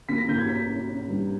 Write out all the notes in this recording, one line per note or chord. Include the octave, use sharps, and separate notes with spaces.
A#3 B6
A#6
A#3 G6
G#6
C#4 B6
C#4
C#4
G2